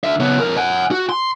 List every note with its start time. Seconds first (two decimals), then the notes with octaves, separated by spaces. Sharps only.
0.04 D3 E5
0.20 C#3 B3
0.40 F2 A#4
0.57 F#5 G#5
0.91 F#4
1.09 C6